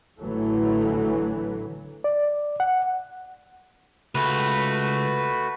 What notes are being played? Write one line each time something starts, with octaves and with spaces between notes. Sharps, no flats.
A1 A2 D3 E3 F#3 A3
D5
F#5
C#2 A3 F#4 B4